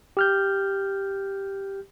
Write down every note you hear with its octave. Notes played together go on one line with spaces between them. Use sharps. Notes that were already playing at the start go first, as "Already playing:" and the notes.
G4 F6 G6